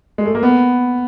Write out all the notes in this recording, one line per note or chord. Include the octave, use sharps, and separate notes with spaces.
G#3
A3
A#3
B3